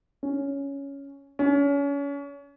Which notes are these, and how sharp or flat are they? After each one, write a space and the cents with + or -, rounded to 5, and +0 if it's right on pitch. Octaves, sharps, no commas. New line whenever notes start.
C#4 +5
C#4 +30